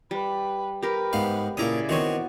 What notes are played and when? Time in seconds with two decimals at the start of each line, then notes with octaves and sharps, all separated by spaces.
0.11 G3 B4
0.83 G4 A#4 B4
1.13 G#2 B3 F5
1.57 A#2 C#3 E4 D5 A#5 D6 D#6
1.89 D#3 B3 C4 F#4 C#5